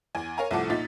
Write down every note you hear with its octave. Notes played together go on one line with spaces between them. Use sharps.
E2 G#5
A#4 C#5 F5 G#5 A#5
C2 A2 F3 A4 F#5 D6
A#2 D#4 A6 B6